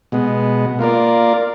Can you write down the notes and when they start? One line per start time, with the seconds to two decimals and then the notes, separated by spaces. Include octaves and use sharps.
0.12 B2 G#3 B3
0.79 A#3 F4 A#4 D5